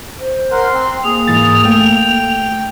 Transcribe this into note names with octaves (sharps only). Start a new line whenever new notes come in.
C5
A#4 F#5 C6
C4
A#3 G#4 F7
G#2 E3 A6
A3 G5